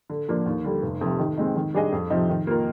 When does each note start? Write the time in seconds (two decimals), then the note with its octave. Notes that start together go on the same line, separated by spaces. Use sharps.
0.10 D3
0.28 F3 A#3 D4
0.46 D#2
0.64 D3 G3
0.82 F1
1.01 F2 C3
1.19 D#3
1.38 G#3 C4 D#4
1.56 D#3
1.74 G3 D4 G#4 D#5
1.92 F2
2.10 C3 F3 C4 D#4
2.29 D#3
2.47 A#3 F4 A#4